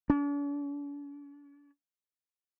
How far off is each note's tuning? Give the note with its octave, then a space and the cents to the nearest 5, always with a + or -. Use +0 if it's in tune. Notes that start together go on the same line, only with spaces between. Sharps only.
D4 -45